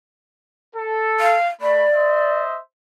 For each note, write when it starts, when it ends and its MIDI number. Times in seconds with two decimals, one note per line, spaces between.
0.75 1.36 69
1.20 1.47 77
1.61 1.85 57
1.61 2.39 74
1.61 1.85 83
1.93 2.58 72
1.93 2.58 75
1.93 2.58 76